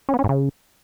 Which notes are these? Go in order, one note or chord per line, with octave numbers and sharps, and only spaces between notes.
C#4
B3
C#4
G#2
C#3